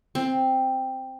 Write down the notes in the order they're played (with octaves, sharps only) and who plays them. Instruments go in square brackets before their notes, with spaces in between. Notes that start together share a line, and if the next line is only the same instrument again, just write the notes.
[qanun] C4